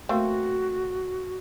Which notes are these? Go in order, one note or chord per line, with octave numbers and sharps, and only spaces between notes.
A3 A#3 C4 F#4